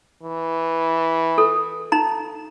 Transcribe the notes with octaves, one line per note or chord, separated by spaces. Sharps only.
E3
A4
D#4 A#5